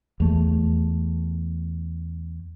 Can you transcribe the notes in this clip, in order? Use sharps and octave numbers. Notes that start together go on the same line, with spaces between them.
E2 A3